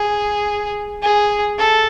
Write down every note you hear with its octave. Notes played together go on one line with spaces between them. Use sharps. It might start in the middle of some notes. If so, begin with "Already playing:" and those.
Already playing: G#4
G#4
A4